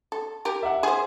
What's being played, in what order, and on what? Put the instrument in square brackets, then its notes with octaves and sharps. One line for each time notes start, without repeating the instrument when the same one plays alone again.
[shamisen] A4
G4 A#4
[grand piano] E5 F#5
[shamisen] G#4 C5